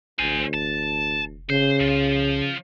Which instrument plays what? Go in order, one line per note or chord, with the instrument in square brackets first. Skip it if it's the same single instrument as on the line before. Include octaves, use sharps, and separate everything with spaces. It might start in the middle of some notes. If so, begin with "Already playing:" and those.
[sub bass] A1 [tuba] D2 [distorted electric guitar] C5 G#5
[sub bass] F1 [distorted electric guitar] A5
[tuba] C#3 [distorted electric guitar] C5
[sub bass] C2 [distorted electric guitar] F3